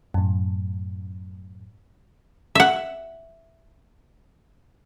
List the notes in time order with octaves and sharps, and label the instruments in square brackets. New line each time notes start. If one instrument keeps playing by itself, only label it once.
[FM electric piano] F#2 A2
[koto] E5 F#5